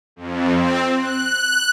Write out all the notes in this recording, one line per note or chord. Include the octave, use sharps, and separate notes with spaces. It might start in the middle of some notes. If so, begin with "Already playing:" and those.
F2
C4
F#6